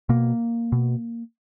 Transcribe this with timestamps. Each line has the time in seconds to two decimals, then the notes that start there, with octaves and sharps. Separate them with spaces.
0.09 B2 A#3
0.72 B2